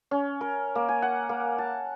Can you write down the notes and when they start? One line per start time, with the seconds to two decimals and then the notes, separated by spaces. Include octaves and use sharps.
0.11 C#4
0.41 A#4
0.75 A#3
0.89 G#5
1.02 F#5
1.29 A#3
1.58 A5